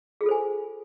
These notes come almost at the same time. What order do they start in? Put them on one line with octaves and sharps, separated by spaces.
G#4 F4 A4 C5 G#5